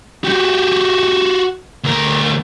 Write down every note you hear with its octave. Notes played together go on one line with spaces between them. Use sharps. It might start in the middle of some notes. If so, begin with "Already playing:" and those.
F#4 G4
D2 A#4